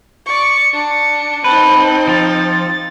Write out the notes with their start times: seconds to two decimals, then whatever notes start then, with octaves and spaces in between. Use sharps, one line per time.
0.26 D5 C#6 C#7
0.73 D4
1.44 C4 D#4 B4 A5
2.08 F3 A6